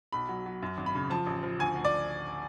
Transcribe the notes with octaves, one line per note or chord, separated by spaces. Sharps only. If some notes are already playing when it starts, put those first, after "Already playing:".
B1 B5
F#3
F#3
F#2
G#1
B5
C#3
F3 A5
A1
F3
D2 G#5
D2
D5